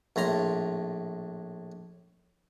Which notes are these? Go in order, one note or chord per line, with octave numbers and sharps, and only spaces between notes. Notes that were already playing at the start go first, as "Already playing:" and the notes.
A#1 A2 A#5 C6